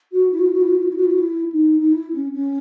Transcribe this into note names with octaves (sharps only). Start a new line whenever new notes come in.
F#4
E4
F#4
E4
F#4
E4
F#4
E4
F#4
E4
F#4
E4
F#4
E4
D#4
D#4
E4
C#4
C#4